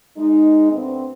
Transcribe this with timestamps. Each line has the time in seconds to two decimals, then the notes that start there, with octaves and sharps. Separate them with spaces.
0.18 G#3 D#4
0.71 D2 B3 C4